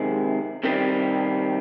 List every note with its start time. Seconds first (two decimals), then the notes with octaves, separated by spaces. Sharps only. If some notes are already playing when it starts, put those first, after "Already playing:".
Already playing: C3 D#3 G#3
0.64 C3 D#3 G3 C4